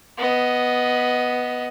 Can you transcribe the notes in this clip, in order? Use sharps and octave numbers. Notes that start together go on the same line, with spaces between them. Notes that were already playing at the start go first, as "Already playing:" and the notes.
B3 D#5